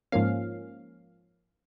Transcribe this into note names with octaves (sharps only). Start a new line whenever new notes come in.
G#2 F3 A#3 C#4 F5